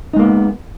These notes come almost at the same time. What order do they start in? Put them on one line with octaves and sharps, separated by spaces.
D#4 G#3 A#3 B3